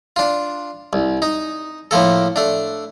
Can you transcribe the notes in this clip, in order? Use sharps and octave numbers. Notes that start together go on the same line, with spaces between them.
D4 F4
C2
D#4
A2 F3 A#3 A4
A3 D4